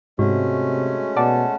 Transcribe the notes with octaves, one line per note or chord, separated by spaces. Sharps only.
G#2 C3 G#3 A3 C#4 F#4
B2 D5 F#5 A5